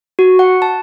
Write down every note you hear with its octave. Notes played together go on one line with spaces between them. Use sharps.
F#4
F#5
A5